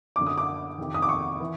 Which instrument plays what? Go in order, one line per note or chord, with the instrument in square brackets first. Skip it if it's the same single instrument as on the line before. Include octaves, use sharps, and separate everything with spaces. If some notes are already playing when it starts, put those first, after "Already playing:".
[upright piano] F#2 D3 D6
D#6
D6
F2 C3 D#3
D#6
D6
C#6
E3